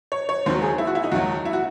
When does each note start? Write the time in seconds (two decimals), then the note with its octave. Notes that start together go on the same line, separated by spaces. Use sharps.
0.12 C#5
0.29 C#5
0.46 D#2 D#3 F#3 C5
0.62 G#4
0.78 E4
0.87 F#4
0.95 E4
1.04 D#4
1.12 D#2 D#3 F#3 F#4
1.45 E4
1.53 F#4